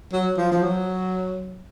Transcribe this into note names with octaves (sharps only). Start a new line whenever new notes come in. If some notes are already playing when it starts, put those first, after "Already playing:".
F#3
F3
F3
F#3